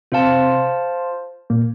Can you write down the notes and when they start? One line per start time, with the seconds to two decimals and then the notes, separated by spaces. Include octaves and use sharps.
0.12 C3 C4 F4 C5 F5 A5
1.50 A#2 A#3